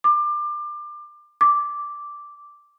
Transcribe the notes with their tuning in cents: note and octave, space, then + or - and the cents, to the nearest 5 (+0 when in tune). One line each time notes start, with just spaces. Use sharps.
D6 +25
D6 -5